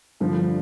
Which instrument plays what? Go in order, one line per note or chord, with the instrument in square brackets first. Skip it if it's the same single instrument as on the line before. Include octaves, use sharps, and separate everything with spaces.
[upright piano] G2 D3 F3